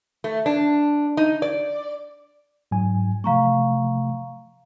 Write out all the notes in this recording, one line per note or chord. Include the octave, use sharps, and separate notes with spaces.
A3
D4
D#4
D5
G#2 F#3 G#5
C3 F3 A3 F5 A#5 C#6